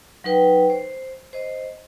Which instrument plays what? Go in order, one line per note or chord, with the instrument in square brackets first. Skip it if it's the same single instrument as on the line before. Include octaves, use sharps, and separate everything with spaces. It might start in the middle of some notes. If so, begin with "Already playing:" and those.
[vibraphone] F#3 D#4 B4 G5
C5
C5 D#5